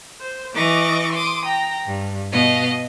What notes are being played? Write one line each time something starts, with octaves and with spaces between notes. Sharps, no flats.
C5
E3 D#5 C#6 D6
C6 D6 D#6
G5 A#5
G2
B2 D#5 F5